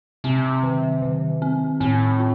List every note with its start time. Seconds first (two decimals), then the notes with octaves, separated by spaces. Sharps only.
0.24 C3 C4
0.63 D#3
1.02 D#3
1.42 C4
1.80 A2 C4
2.19 F4